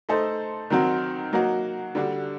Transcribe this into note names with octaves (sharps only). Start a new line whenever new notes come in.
A3 D#4 A4 C5
D#3 F#3 C4 F#4
F#3 A#3 D#4 F#4
D3 G3 D4 F#4